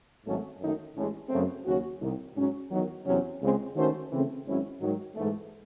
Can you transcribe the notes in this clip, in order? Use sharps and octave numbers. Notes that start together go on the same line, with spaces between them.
G#1 G#2 F#3 A3 C#4
F#2 D#3 A3 D#4
A1 A2 G#3 C#4
F#2 C#3 F#3 A3 C4
D#2 C#3 F#3 C#4 F#4
C2 C3 D#3
G#2 F#3 C#4
E2 D#3 F#3
E2 C3 F#3 C#4
C#2 C#3 G#3 C4
D#3 A3 C#4 F#4 C5
C#3 E3 A3 C4
G#1 G#2 F#3 C#4 E4
G#2 D#3 F#3
G#2 E3 A3